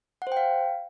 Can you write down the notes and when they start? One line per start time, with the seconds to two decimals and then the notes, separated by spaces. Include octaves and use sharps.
0.22 F#5
0.27 C5
0.32 G5
0.37 F5